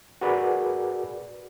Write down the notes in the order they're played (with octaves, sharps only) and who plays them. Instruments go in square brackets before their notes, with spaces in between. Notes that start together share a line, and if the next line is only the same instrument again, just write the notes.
[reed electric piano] F#4 G#4 A#4 B4 D5